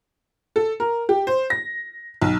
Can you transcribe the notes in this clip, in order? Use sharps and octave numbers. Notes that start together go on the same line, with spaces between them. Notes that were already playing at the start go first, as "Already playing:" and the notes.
A4
A#4
G4
C5
A#6
B1